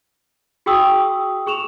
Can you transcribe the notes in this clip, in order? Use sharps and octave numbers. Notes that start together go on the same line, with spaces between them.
F#4 G#4 G5 C#6 D#6 E6
G#4 C#6 E7 F7